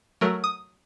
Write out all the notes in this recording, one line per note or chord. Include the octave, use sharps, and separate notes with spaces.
F#3 A3 A#4
D#6